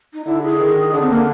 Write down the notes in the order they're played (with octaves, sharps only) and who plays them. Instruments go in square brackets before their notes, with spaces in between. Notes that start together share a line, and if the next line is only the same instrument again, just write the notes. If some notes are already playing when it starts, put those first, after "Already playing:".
[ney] D#4
[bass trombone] D3 [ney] E4
[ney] G#4
[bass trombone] D#3
[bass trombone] D3 [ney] D4
[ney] C4
A#3